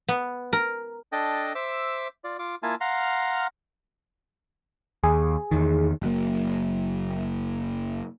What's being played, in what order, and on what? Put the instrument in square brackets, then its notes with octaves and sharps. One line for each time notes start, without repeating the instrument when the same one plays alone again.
[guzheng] B3
A#4
[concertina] D4 A4 D#5 G5
C5 E5 D6 E6
F4 D5
F4 D6
A#3 E4 F4 G#5 A5
F5 F#5 A#5 C6 F6
[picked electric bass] D#2 [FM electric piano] G#4
[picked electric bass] E2 D#3
[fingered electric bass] F#1 F#3 A#3